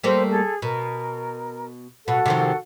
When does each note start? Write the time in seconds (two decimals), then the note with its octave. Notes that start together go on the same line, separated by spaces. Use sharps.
0.04 G3 A3 A#3 C5
0.29 G#4 A4
0.62 B2 A#4
2.08 B2 F#4 A4 F#5
2.26 C3 D#3 F3